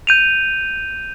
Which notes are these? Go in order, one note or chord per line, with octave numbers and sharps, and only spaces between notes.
G6 D#7 F7